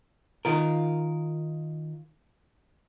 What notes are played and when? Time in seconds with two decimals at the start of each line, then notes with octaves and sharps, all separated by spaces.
0.45 D#3 F4 A#4